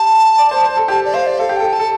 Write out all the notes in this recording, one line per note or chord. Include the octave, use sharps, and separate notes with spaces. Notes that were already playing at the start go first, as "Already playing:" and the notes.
Already playing: G4 A5
D5
C5
C5
A4
G4 A5
D5
C5 F5
D5
A4 F5
G4
A4 G5
A5
A4